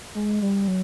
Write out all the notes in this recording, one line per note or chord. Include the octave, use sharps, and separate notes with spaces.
G#3
G3
F#3